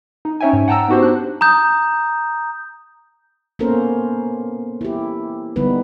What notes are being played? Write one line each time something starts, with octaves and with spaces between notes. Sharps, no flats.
D#4
C#4 D#4 C#5 E5 G5 G#5
G#2
F#5 G5 A5 A#5 E6
B3 D#4 F#4 G4 C5
D4 F#6
A#5 D#6 G6
A#3 B3 C#4 A4 A#4 C5
E4 G4
D3 G3 B3 D#4 B4